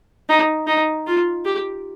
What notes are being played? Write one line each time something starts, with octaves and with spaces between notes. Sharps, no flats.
D#4
D#4
F4
G4